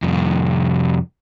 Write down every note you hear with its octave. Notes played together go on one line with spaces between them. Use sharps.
C2 F2